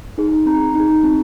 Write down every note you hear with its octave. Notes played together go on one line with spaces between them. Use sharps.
D#4 G#4
C4 A#5
D#4 G#4
C4